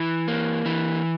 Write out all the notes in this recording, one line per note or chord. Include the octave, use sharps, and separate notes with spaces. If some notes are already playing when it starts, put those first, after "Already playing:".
Already playing: E3 E4
A#3
E3